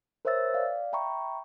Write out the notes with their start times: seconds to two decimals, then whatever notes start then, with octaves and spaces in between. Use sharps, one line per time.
0.25 A#4 C5 C#5 E5 E6 A6
0.54 D5 F5
0.93 E5 G5 A#5 B5 C#6